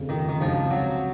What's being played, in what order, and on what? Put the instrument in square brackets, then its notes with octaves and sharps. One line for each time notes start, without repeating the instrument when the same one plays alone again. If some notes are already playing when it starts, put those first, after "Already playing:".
Already playing: [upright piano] F1 F2 C#3
[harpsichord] D#3
D#3
[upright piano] C#2 C3 F#3 [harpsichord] F3
[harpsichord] F#3